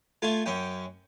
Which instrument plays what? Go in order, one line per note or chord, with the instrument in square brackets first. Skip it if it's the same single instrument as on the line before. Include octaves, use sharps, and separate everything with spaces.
[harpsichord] A3 F4 G#5 C6
F#2 C#4 G5